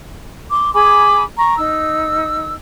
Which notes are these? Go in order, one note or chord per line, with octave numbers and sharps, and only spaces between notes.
C6 D6
G#4 G#5 B5 D6
A#5 C#6
D#4 E6